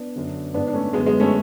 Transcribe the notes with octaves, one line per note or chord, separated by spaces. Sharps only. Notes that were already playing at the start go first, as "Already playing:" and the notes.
Already playing: B3 D4
F#2 D3
G#2 B3 D4
D4
A3 C#4
F#2 D3 G#3 B3
G#3 B3
A3 C#4